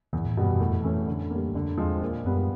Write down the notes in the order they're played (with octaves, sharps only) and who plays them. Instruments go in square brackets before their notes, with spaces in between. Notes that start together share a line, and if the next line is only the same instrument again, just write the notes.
[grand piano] E2 [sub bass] G2
[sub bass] A2
[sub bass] G2 [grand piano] B2 G3 B3
[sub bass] F#2
[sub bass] F2 [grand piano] A2
[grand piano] E3 A3 C#4
D3
G3 A#3
[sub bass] F2 [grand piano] D3
[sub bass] E2 [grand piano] F3 G#3 C4
[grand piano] A#2
[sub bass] F#2 [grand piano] G3 B3